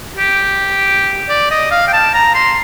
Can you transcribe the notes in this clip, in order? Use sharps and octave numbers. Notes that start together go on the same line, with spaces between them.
G4
D5
D#5
F5
G5
A5
A#5
C6